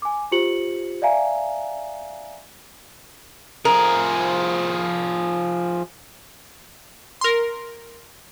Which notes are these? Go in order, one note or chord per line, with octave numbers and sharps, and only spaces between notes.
G#5 D6
F4 G4 C5 C#7 F#7
D5 E5 F5 G#5 A#5
F3 G#4 A#4
A#4 C6